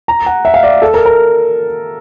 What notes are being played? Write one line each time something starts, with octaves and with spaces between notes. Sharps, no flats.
A#5
F#5
E5
F5
D5
A4
A#4
A#4